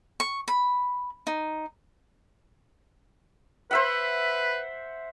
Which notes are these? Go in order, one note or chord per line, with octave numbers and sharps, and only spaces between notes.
C#6
B5
D#4
B4 C5 E5 F#5